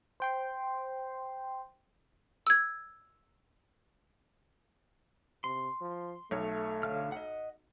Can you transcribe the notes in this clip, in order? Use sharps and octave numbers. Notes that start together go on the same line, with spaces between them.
C5 G5 C6
E6 G#6
C3 C6
F3
B1 A3 C#5
D3 F5 F6
D#5 F#5